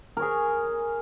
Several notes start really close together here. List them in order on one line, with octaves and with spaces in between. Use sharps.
A#4 C#5 G#4